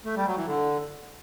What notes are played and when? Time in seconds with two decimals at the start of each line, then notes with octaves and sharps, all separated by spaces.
0.05 A3
0.16 G3
0.26 F#3
0.36 E3
0.46 D3